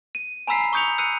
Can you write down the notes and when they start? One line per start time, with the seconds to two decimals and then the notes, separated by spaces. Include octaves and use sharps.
0.15 D#7
0.47 G#5 A#5 B5 E6 B6 C7
0.73 C#6 D#6 G6 C#7 F7
0.98 E6 F#6 C7 C#7 D#7